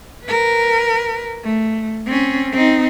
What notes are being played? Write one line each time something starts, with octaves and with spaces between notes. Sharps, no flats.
A#4 B4
A3
C4 C#4
C4 D#4